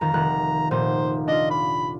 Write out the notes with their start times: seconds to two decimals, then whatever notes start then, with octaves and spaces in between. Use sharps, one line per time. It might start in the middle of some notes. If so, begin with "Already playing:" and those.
0.01 F2 D#3 A#5
0.14 F1 D#3 F#6
0.71 F1 A#2 D#4 C5
1.28 D4 F4 D#5
1.51 B5